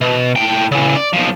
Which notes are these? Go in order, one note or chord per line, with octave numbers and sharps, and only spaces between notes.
B2
A2 G5
C#3 E3
D5
B1 F3